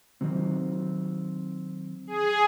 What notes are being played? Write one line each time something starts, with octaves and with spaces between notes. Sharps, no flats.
D#3 F#3 C4
G#4